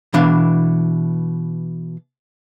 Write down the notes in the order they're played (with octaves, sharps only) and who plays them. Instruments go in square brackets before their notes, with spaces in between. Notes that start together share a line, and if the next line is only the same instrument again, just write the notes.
[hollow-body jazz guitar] B2 E3 D4 F5